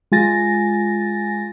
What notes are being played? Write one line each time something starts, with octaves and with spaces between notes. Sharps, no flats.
G#3 F4 G#5 A6 A#6